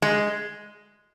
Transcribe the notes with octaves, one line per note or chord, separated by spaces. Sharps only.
G#3